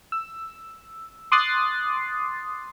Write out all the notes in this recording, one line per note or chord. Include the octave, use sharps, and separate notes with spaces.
E6
C6 D6 D#6 F#6 A6 C7